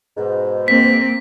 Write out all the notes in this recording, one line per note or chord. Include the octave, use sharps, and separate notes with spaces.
G#2 B2
A#3 C4 B6